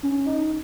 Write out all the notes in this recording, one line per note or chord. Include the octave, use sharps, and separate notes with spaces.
C#4
D#4